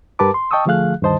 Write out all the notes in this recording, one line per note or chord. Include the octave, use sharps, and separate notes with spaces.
G2 G4 A#4 B4 A5 D6
C6
D#5 G5 A5 C#6 D#6 E6
D3 F3 A3 G#4 F5 F#6
D2 G2 D#3 C5 D#5 A5